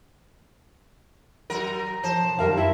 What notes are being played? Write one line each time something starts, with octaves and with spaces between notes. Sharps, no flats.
F#3 A#4 F#5
F3 C5 C#5 A5
B2
F#2 D#3 G3 A#4 F5
E4 E5